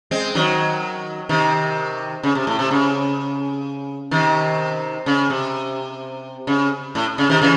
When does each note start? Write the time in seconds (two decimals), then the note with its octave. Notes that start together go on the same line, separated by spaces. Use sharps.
0.11 G#3 C4
0.35 D#3 F#3
1.29 C3 D#3
2.23 C#3
2.35 C3
2.47 A2
2.59 C3
2.71 C#3
4.11 C3 D#3
5.06 C#3
5.30 C3
6.47 C#3
6.95 A2
7.18 C#3
7.29 C3 D#3
7.42 C#3 E3